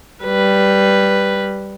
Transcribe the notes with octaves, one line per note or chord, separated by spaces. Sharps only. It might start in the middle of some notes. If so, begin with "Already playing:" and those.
G3 B4